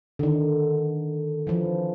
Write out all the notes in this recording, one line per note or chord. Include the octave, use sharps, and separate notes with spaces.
D3 D#3
E3 F3